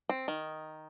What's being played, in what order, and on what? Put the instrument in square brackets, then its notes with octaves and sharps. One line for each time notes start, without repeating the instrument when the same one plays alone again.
[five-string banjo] C4
D#3